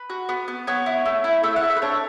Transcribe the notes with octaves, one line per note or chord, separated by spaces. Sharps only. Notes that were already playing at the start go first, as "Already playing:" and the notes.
Already playing: B4
F#4
B3
B3
B3 C#5
E4
A3
E4
A3 E5
F#5
A3
E5
B4
D4 C#5